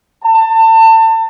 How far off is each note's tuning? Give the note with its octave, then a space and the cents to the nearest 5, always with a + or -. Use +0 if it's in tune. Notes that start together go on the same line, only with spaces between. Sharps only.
A5 +30